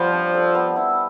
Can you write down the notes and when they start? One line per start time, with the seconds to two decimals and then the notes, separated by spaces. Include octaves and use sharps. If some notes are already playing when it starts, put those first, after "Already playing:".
Already playing: F3 G3 B3
0.13 D4
0.34 A4
0.55 B3
0.76 E4